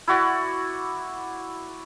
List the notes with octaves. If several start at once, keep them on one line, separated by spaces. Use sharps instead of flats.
E4 F#4 D5